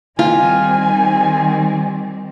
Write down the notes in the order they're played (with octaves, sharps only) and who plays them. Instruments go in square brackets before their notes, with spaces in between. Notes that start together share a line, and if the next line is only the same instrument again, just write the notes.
[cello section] D#3 G3 C4 [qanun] F4 [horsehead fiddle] G#5